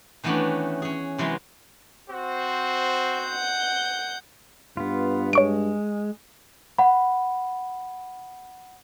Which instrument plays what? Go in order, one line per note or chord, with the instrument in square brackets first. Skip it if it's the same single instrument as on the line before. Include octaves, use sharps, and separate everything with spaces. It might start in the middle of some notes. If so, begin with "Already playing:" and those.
[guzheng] D#3 E3 A3 B3 C#4 D4
C#4 G#4
C3 E3 F#3 G#3 B3
[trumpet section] C4 F#4 C5
[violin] F#5 G6
[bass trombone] G2 [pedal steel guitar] B3 F4
[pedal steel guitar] G#3 [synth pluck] C#5 C#6 D7
[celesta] F#5 B5